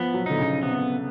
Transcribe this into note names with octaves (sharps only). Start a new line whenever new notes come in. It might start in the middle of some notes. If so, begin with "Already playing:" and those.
Already playing: F3 B3
F#3
D3 D#4
C#3
C3 B3